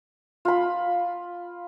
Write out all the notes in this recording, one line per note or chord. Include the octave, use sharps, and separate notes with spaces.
F4 B5